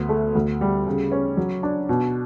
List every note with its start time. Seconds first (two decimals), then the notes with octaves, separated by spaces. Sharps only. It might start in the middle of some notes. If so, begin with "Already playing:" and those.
Already playing: D2 B3
0.09 A3
0.35 D2
0.61 G3
0.87 C#3
1.12 C#4
1.37 F#3
1.63 D4
1.89 B2